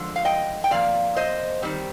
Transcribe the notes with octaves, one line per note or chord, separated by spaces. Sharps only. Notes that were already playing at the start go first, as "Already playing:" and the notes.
Already playing: D3 F3 G#3
F5
D#5 G5
G5
C3 F3 A#3 D5 F5
C5 D#5
D#3 G3 C4